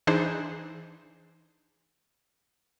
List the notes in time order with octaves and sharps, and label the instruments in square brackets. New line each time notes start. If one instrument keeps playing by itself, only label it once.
[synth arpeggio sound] E3 D4 D#4 G#4 C5